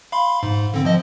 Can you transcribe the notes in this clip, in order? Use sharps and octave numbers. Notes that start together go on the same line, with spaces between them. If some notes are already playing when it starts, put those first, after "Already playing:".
F5 B5 C6
G#2
D3 C4
F3 D#5